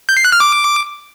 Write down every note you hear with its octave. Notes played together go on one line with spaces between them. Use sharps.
G6
C7
F#6
F6
D6